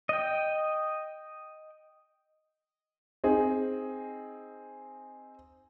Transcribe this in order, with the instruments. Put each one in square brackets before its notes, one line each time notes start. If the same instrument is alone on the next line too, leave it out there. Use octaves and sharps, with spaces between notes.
[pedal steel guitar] D#5 G5
[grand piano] C4 D#4 G#4 D#5